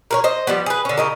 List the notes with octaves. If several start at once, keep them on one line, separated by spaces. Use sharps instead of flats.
A#4 B4 C#5
C5 D#5
F3 G3 B3
G#4 B4
D3 C#4
C#3 D#4 A#4